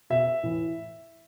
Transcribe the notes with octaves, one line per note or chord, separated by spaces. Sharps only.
B2 E5
A2 E3